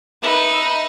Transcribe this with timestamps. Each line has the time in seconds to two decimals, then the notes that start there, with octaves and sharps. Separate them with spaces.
0.23 D#4 B4 E5